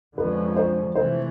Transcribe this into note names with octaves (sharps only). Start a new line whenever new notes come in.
F2 D3 F3 G#3 C#4 B4
C5
C3 E3 A3 C5